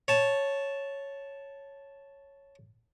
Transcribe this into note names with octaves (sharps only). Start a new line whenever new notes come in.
C#5 A5